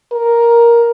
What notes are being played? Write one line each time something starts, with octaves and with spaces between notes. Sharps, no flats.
A#4